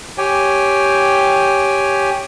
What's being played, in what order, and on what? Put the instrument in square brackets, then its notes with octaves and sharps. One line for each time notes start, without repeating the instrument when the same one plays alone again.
[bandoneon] G4 C#5 G5 G#5